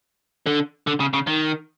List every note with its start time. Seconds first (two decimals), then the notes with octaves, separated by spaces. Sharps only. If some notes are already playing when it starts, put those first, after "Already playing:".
0.46 D3
0.87 D3
1.00 C#3
1.13 C#3
1.27 D#3